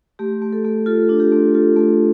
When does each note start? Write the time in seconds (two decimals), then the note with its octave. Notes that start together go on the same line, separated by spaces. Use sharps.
0.19 A3 G4
0.42 A3
0.52 A4
0.64 A3
0.86 F4 A4
1.09 D4
1.20 G4
1.32 A3
1.54 F4 A4
1.76 A3